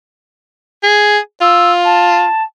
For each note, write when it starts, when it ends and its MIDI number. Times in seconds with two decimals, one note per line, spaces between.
0.83 1.19 68
1.41 2.26 65
1.41 1.72 88
1.84 2.43 81